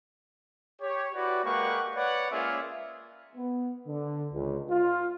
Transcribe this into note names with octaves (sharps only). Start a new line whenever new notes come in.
G4 C#5
E4 F#4 G4 B4 D5
G#3 A#3 G4 B4 F#5 C#6
B4 C#5 D5 F#5
G#3 A#3 C#4 F4 G#4 E5
B3
D3
C#2
F4